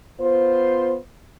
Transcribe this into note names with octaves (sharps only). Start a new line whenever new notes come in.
B3 F4 C5